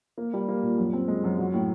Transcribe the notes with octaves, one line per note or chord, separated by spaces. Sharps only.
A#3
G3
A#3
A#2
F#2
C4
G#3
F#2
F#3
A2